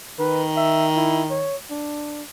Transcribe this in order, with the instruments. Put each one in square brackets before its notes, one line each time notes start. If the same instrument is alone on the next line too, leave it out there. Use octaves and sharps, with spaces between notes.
[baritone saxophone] D#3 [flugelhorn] B4
[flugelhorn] E5
E4
C#5
D4